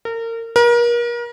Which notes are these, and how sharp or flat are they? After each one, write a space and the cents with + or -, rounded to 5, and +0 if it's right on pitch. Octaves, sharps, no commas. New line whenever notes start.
A#4 -30
A#4 +35